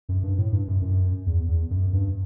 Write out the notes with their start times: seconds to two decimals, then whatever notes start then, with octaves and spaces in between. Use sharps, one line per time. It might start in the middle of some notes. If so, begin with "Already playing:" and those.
0.09 F#2
0.23 G2
0.38 A2
0.52 G2
0.67 F#2
0.82 F#2
1.26 E2
1.49 E2
1.70 F#2
1.93 G2